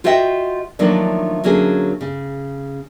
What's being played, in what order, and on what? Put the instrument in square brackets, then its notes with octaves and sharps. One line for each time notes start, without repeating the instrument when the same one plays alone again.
[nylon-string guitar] F4 F#4 C5 D#5 E5 G5
D#3 F3 F#3 A3 A#3 D4
D3 F#3 A#3 C#4 G#4
C#3